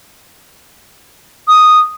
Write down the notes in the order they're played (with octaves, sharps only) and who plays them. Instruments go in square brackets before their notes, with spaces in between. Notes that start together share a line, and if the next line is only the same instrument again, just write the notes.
[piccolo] D#6